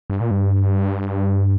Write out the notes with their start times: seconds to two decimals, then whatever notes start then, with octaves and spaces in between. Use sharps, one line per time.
0.10 G2
0.21 A#2
0.31 G2